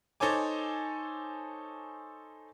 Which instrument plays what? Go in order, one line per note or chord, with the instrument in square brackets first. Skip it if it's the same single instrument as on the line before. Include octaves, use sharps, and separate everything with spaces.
[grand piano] D#4 A4 C5 C#5 G#5 D6